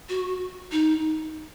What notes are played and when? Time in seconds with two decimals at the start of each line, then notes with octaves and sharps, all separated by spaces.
0.09 F#4
0.72 D#4